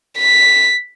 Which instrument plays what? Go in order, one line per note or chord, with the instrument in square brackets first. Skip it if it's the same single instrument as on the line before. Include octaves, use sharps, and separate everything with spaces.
[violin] B6